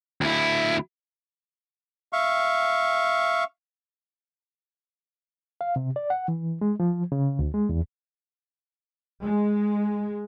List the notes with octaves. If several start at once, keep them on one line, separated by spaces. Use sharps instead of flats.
D2 E4
E5 F5 C#6
F5
C3
D5
F#5
E3
G#3
F3
C#3
D2
G#3
E2
G#3